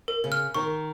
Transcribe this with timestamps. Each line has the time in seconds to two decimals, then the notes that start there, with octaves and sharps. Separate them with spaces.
0.08 A#4
0.24 C#3
0.32 F6
0.54 D#3 C#6